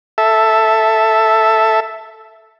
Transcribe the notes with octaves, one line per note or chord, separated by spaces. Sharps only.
A4 E5